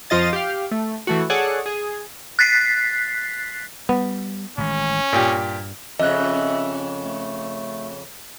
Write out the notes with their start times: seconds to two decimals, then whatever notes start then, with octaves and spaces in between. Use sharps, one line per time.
0.10 F2 F3 F4 D#5 A6
0.33 G4 F5
0.71 A3
1.07 E3 A3 F#4
1.30 G#4 A4 C#5 D5 F#5
1.66 G#4
2.39 F#6 A6 B6 C7
3.89 G3 B3
4.58 A1 D#3 G#3 C#4
5.13 G2 A#2 G4
5.99 F2 C#3 D#5 E5 F#6
7.01 A3